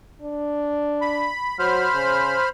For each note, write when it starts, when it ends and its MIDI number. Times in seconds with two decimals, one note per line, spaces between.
0.22 1.29 62
1.01 1.58 83
1.59 1.87 54
1.59 2.49 72
1.59 2.49 83
1.59 2.49 89
1.94 2.35 49